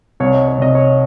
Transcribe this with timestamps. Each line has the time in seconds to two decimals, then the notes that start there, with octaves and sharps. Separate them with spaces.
0.20 C2 C#5
0.34 D#5
0.48 C#5
0.58 C3 D#5
0.75 C#5